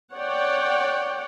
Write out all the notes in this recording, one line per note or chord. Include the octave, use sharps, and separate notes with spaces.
C#5 D5 F#5 G5